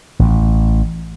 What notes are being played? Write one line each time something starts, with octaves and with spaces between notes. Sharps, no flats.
A1